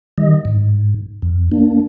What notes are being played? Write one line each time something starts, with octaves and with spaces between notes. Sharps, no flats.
D#3 G3 D#5
G#2
F2
A#3 D4